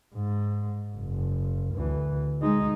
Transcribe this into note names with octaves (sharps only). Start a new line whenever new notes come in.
G#2
F#1
D2 E3
G#3 D#4